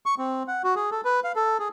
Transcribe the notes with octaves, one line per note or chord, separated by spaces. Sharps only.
C#6
C4
F#5
F#4
G#4
A4
B4
F5
A4
G#4